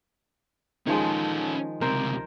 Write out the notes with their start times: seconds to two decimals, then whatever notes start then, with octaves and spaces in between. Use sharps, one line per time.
0.87 D#3 F3 G#3 C#4 A4
1.81 C#2 C3 A#4 C5